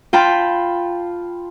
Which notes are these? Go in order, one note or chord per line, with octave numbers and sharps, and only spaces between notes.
F4 G5 A5 B5